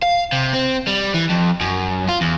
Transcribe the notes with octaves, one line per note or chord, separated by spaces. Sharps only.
F5
C3
C4
G3
E3
F2
F#2
F4
E2